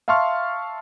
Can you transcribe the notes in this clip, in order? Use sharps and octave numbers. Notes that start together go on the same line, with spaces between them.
E5 F5 A5 C6 C#6 F6